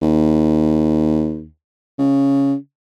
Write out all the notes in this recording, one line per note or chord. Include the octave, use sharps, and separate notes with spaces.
D#2
C#3